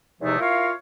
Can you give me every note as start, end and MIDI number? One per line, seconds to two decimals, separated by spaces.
0.21 0.39 40
0.21 0.39 48
0.21 0.39 53
0.21 0.39 56
0.21 0.39 57
0.21 0.39 63
0.39 0.70 64
0.39 0.70 65
0.39 0.70 70
0.39 0.70 73
0.39 0.70 77